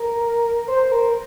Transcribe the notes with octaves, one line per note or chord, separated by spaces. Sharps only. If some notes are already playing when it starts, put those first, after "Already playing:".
Already playing: A#4
C5
A#4